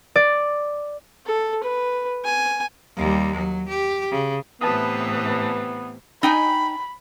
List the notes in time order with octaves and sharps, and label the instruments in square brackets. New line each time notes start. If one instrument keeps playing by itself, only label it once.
[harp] D5
[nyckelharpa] A4
B4
G#5
[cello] D#2 G3
F#3
G4
C#3
[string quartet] A2 C3 E3 [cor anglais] B3 [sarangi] B4 [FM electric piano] A5 D#6
[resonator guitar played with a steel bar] D#4 G5 G#5 [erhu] B5